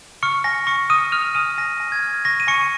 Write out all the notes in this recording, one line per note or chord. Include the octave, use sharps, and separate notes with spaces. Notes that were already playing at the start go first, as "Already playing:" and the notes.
C#6 F6 C#7
G#5 A#6
G#5 C#6 C#7
D#6 F6 D#7
F6 F7
G#5 D#6 D#7
G#5 A#6
G#5
G#6
F6
C#6 A#6
D#7
G#5 C#6 C#7